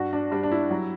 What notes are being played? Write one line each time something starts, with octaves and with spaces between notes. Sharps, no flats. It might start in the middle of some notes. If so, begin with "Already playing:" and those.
Already playing: G2 F#4
D4
G3 D4
D4
E4
F#3